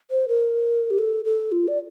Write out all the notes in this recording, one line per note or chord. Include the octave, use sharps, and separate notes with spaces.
C5
A#4
G4
A4
A4
F4
D5